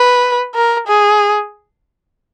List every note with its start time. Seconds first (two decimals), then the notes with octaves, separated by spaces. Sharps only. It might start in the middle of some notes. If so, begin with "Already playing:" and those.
Already playing: B4
0.55 A#4
0.88 G#4